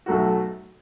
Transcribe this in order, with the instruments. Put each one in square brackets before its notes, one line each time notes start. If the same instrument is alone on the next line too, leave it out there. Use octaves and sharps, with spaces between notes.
[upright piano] B1 A2 F#3 A3 F#4